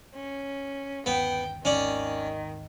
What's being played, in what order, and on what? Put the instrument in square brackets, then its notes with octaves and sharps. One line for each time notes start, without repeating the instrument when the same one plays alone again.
[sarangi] C#4
[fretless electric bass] G1 D#2 [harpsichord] B3 [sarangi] G5
[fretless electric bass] G#1 D#2 [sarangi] D#3 [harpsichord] C#4 D5